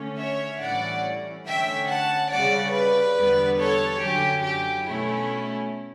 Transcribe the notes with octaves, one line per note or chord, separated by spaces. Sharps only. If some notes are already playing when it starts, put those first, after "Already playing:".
Already playing: D3 A3 C#4
C#5 E5
A2 E3 G3 C#4 E4 D5 F#5
D3 A3 C#4 E5 G5
F#5 A5
C#3 G3 C#4 D5 F#5
B4 D5
E2 D3 G3 B3
A4 C#5
F#2 D3 F#3 C#4 G4
G4
B2 A3 C#4 E4